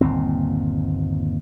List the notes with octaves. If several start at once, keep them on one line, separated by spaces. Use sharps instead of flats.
G1 D#2 A#2 C4